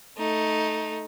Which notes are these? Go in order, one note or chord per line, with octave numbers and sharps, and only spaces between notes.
A3 D#4